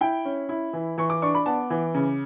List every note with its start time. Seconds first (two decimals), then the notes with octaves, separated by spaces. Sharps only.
0.01 E4 G5
0.25 C#4
0.49 E4
0.73 E3
0.98 E3 C#6
1.10 D6
1.22 D4 C#6
1.35 B5
1.46 B3 A5
1.70 E3
1.95 C#3